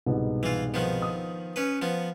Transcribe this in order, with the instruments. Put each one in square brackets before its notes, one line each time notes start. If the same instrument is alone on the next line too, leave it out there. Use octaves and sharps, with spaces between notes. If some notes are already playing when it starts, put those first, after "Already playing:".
[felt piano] C2 G#2 B2
[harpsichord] E3 F4
D#3 F3 B3
[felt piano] D#6
[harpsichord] C#4 B4
F3 B3